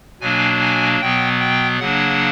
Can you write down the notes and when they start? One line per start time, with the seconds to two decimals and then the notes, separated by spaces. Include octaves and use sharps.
0.21 B2 F#3 A#3 D4 G#5
0.60 G#5
1.00 B2 F#3 B3 G5
1.40 G5
1.80 C#3 F#3 A#3 D4 F#5